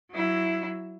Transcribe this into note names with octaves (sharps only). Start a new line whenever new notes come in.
F#3 E4